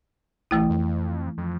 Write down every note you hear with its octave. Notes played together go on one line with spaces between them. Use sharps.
B1 E3 A3 E4
F2
F2